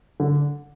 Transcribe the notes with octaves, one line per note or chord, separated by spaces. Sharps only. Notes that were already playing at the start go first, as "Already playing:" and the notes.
D3